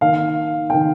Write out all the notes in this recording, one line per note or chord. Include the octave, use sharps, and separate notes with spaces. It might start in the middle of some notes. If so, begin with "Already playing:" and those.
D#3 A#3 F5
D#3 A#3 G5